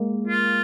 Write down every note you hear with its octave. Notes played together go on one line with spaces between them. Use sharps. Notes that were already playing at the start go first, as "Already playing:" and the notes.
Already playing: G#3 A#3
F4